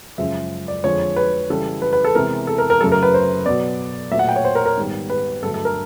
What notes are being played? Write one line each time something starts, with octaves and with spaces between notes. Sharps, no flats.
F#2 C#3 F3 G#3 E5
D5
F2 D3 F3 G#3 C#5
B4
C#3 E3 G3 A4
B4
B4
A4
C3 E3 G#3 B3 A#4
A4
A#4
A#4
F#2 C#3 F#3 A3 A4
A#4
B4
C5
B2 F#3 B3 D5
A#2 F#3 A3 E5
F#5
G5
C#5
C5
A#4
A#4
G#2 D#3 G3 B3
B4
G2 D3 F#3 A3 A4
A4
A#4